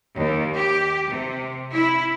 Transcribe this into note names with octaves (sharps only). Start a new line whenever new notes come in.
D#2
G4
C3
E4